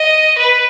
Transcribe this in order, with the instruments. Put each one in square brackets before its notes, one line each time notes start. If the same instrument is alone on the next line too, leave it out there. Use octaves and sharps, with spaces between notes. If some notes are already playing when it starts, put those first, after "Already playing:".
Already playing: [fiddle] D#5
B4